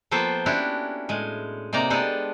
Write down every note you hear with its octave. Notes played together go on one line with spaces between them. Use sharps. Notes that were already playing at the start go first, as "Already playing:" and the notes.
F3 A#3 B3 A4 C5 G5
C#4 D4 E4 F#4 G4
A2 G#3
C3 A#3 D#4 D5 A#5
G#3 B3 D4 G4 A4